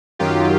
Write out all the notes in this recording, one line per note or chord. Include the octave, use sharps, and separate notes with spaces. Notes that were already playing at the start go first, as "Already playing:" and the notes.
F#2 D#3 F#3 F4 G4